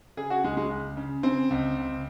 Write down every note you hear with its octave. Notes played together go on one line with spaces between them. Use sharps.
C#3 G#4
F#4
C#2 G#3
G#3
C#2
C#3
C#3 C4
C#2
C#2